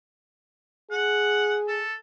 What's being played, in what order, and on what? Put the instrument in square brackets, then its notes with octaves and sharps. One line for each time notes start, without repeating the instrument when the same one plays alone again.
[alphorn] G#4 [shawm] F#5
[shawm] A4